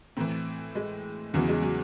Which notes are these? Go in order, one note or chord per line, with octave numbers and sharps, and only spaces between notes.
A2 E3 C4
G#3
E2 C#3 E3 F#3
G#3
F#3